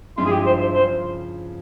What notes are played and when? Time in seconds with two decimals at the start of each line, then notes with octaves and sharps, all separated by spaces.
0.17 G2 F3 G#3 E4 F4
0.25 G#4
0.32 G4
0.46 C5
0.60 C5
0.74 C#3 F3 C5